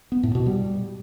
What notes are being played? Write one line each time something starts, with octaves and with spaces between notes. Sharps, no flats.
B3
A2
B2
G3